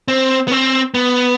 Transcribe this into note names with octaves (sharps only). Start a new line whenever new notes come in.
C4
B3
C4
B3